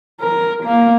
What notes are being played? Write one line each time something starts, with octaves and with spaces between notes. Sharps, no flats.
A#4
A#3